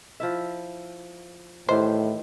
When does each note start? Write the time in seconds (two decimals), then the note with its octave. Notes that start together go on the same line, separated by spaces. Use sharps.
0.20 F3 E4 E5
1.69 A2 D#3 E3 G4 C5